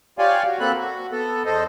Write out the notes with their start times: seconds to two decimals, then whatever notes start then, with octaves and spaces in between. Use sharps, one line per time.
0.19 F4 G4 C#5 D5 F5 G#5
0.47 F#4
0.60 A#3 C4 A4 B5 F#6
0.79 F#4
1.11 B3 A4
1.45 E2 A4 C5 D#5